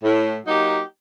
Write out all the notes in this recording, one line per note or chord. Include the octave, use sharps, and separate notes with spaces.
A2
F#3 A#3 D#4 G4